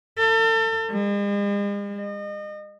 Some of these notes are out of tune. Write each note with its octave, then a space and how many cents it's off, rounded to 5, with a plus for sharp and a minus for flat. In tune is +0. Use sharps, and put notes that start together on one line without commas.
A4 +35
G#3 -45
D#5 -35